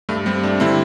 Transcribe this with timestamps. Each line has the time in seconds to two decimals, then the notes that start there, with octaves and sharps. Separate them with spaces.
0.09 G2 G3 A3
0.26 G3 C4
0.43 A3 D4
0.60 D3 G3 C4 E4